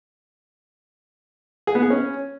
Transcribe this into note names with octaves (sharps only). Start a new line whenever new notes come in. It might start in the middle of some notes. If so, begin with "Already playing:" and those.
G#4
B3
G#4
C#4